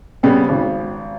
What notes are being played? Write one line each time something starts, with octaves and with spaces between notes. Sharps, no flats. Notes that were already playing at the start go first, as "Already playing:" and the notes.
C#3 G3 B3 C4
G#1